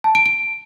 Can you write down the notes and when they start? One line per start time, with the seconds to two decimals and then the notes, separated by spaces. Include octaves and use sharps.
0.04 A5
0.15 D7
0.26 D7